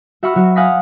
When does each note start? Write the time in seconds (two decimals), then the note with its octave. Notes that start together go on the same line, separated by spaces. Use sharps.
0.23 F#4 E5 F#5 B5 C#6 F6
0.35 F#3 F#4
0.56 F5 F#5 G#5 D#6 A#6 B6